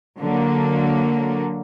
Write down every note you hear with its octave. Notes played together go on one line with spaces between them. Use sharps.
D3 F#3 A#3